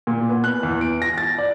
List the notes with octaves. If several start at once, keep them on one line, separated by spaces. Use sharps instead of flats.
A#2
B3
F#6
E2
D7
A#6
A6
D5